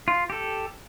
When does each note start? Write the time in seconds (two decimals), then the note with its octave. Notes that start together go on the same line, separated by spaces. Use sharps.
0.08 F4
0.30 G4 A4